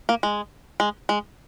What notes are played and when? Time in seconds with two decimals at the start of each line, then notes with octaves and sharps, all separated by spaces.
0.09 A#3
0.23 G#3
0.80 G#3
1.09 G#3